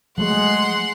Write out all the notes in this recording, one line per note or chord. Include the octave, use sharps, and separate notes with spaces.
F3 F#3 G#3 A3 F#5 C6 F#7